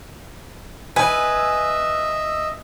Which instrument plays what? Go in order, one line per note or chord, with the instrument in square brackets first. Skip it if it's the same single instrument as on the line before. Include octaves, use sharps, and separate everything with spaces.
[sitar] B4 [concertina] D#5 E5 E6 [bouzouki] G#5